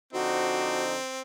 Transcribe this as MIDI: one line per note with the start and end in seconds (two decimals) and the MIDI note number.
0.13 0.95 50
0.13 0.95 53
0.13 1.21 60
0.13 0.95 63
0.13 0.84 66